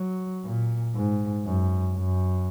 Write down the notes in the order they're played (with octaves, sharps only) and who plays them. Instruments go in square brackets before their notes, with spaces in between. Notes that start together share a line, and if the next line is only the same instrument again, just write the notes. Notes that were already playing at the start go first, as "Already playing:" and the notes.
Already playing: [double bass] F#3
A#2
G#2
F#2
F#2